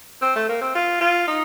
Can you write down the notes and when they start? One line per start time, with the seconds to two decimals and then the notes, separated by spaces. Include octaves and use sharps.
0.22 C4
0.35 A3
0.49 A#3
0.61 C4
0.75 F4
1.01 F4
1.27 D#4